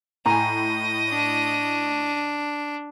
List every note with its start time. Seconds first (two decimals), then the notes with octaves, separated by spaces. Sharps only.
0.26 A2 D#5 G#5 A#5
1.10 D4